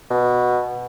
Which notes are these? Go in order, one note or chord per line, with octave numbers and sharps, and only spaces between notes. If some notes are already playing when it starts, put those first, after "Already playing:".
B2